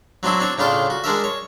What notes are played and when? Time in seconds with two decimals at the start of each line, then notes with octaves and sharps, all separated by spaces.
0.23 F#3 C4 D4 E4 F#4
0.40 C4 D4 C#5
0.58 A2 C#3 D4 F4 D5 G5
0.90 F#4
1.04 G#3 D4 A#4 E5
1.24 C#5